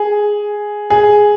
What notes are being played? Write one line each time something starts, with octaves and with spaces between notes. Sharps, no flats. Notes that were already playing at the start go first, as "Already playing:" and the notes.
Already playing: G#4
G#4